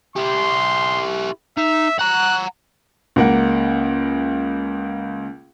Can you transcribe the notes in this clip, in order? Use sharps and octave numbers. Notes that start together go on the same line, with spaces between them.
E4 G4 C6
D#4 E5
F#5 A#5 F#6
C#2 A#3 F#5